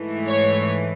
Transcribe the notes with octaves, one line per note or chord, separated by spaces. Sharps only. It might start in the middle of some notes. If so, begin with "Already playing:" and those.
Already playing: G#2 E3 A3
C#5